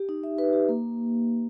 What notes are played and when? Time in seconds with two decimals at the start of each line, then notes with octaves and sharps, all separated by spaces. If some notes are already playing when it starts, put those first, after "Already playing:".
Already playing: G4
0.09 D#4
0.24 E5
0.39 B4
0.53 G4
0.69 A#3